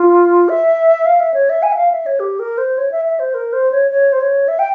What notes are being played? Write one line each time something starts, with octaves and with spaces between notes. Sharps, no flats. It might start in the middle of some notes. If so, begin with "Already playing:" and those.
Already playing: F4
E5
F5
E5
C#5
E5
G#5
E5
F5
E5
C#5
G4
A#4
C5
C#5
E5
E5
C5
A#4
C5
C#5
C#5
C5
C#5
E5
G5